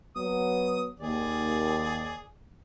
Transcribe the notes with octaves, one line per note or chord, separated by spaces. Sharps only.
F#3 B3 D#6
D#2 G#4 D5